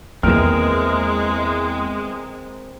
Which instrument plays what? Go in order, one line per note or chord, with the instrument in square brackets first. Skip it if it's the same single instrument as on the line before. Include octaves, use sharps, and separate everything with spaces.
[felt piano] E2 F6 [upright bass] D#3 A#3 [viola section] G#3 [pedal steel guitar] C4 A#4